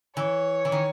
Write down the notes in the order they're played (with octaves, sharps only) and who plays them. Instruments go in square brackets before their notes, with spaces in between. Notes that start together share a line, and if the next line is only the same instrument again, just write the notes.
[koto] E3 [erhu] C#5
[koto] E3
D#3